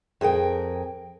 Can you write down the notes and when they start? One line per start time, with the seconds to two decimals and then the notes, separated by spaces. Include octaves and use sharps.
0.21 F2 G#4 A#4 G5